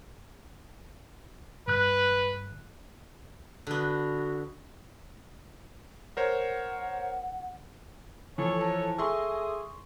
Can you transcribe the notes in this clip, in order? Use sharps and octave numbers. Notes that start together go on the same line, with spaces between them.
G2 B4 F#6
D3 B3 F#4
A#4 C5 C#5 F#5
E3 F3 A4 C#5
E4 C5 A5
G#4 A4 E5 C6 C#6 E6